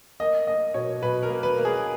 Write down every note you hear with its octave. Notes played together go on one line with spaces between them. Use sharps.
A#3 D#5
A#3 D#5
B2 C#5
B2 B4
A#4
A#3
B4
A#3
G#4